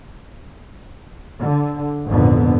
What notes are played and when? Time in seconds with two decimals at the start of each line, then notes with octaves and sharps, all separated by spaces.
1.39 D3
2.07 G#1 F2 A#2 D3 B3